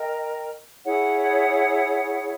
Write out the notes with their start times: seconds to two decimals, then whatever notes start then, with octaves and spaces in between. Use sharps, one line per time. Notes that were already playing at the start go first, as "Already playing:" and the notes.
Already playing: A#4 D#5 G5 A#5
0.84 E4 G#4 C#5 F#5